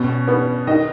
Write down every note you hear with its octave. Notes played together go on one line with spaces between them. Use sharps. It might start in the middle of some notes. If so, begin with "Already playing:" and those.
Already playing: B2 C#4
B3
D#3 D#5